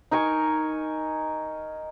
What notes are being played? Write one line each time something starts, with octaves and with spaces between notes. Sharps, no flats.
D#4 A#4 G#5 C#6